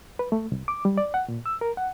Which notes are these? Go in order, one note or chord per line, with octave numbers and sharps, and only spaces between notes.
B4
A3
C2
D6
G3
D5
F#5
A#2
E6
A#4
F#5